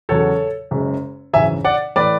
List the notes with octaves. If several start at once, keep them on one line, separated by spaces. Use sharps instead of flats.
E2 C#3 F#3 A4 C#5
F#1 F#2 C#3 G#3
G#1 F#2 C#3 E3 E5 G#5
D5 F#5
A2 E3 A3 B4 D5